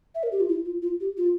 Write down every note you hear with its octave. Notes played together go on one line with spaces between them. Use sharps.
E5
A#4
G4
F4
E4
F4
F4
G4
F4